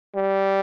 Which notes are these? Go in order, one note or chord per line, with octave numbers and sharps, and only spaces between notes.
G3